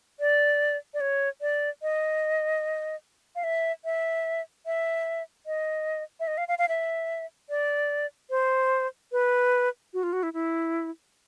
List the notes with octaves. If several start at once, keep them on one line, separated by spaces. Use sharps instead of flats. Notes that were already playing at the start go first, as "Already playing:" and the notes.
D5
D5
C#5
D5
D#5
F5
E5
E5
E5
D#5
E5
D#5
F5
F5
F5
E5
D5
C5
B4
F#4
F4
F#4
E4
E4